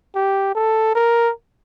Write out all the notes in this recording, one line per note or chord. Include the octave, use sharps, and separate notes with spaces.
G4
A4
A#4